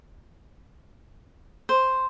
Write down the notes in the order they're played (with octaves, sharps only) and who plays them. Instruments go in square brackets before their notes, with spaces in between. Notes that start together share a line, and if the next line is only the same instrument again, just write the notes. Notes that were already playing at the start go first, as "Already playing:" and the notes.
[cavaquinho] C5